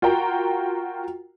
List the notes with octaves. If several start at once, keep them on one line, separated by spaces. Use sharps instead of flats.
F4 F#4 A#4 G5 A#5